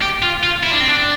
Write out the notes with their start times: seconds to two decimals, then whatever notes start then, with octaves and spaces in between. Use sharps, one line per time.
0.02 G4
0.22 F4
0.43 F4
0.63 E4
0.72 D4
0.80 C4
0.89 D4